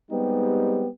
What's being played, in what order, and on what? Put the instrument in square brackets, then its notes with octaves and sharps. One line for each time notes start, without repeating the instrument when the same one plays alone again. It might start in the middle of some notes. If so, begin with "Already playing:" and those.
[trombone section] G3 G#3 B3 C4 D#4 G4